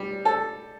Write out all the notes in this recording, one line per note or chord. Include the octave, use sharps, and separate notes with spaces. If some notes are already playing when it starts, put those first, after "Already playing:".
Already playing: G3
A4